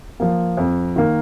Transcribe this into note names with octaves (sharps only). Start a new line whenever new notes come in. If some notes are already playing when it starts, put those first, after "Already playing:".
F3 A#3
F2
D#3 A#3